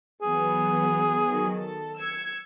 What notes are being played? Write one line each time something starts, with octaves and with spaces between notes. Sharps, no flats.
E3 F#3 B3 G#4
D#3 F#3
A4
E6 G#6 C#7